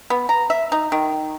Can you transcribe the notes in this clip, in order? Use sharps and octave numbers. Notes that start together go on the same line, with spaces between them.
B3
A#5
E5
D#4
D#3